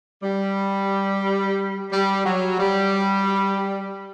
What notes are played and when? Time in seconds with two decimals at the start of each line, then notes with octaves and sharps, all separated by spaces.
0.23 G3
1.92 G3
2.25 F#3
2.59 G3